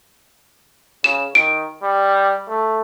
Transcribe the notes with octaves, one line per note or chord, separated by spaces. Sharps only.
C#3 E7
D#3 D7
G3
A3